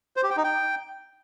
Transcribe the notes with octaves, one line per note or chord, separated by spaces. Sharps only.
C5
G4
G5
D#4
G5